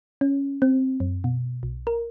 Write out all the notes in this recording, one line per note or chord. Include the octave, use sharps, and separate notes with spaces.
C#4
C4
F#2
B2
B1
A#4